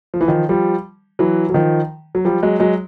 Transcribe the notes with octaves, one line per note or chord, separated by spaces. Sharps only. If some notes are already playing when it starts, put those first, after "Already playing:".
F3
E3
D#3 F3
F3 G3
E3 F#3
F#3
D#3 F3
F#3
F3 G3
F#3 G#3
F#3 G#3